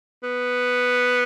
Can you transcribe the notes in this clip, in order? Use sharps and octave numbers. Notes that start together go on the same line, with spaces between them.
B3